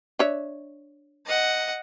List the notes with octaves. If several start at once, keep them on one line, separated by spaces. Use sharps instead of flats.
D4 C#5 E5
D#5 F#5